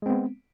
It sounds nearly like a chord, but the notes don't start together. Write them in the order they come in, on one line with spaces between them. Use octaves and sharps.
G#3 C4 B3